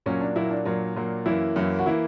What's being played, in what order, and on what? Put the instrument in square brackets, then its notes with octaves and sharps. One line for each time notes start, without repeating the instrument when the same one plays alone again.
[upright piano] A#2 F#3 A#3 [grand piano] C#4
[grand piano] D4
[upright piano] A#2 F#3 A#3 [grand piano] E4
[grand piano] D4
[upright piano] A#2 F#3 A#3
A#2 F#3 A#3
[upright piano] F#2 E3 A#3 [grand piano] E4
[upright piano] F#2 E3 A#3
[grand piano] F#4
[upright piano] E3 A#3 [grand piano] E4